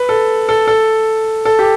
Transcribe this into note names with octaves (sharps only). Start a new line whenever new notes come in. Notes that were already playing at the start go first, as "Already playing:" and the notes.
Already playing: B4
A4
A4
A4
A4
G4